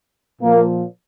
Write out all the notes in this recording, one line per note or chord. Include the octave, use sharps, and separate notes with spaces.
A#2 F3 A#3